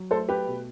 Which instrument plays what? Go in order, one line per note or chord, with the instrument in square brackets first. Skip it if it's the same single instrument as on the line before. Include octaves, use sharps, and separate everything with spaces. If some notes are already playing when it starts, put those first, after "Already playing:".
Already playing: [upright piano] F#3
A3 A4 C5
G4 B4
B2